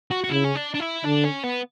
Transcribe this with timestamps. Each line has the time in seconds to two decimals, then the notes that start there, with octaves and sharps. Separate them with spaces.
0.11 F#4
0.24 F#4
0.30 C#3 E4
0.44 C#4
0.55 D4
0.75 D4
0.80 E4
1.05 D3 D4
1.25 C#4
1.44 B3